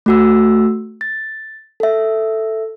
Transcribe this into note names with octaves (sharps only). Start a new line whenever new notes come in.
A3 F#4 E6
A6
A4 E5